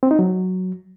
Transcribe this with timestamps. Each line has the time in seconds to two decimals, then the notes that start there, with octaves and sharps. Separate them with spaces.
0.03 C4
0.11 D#4
0.19 F#3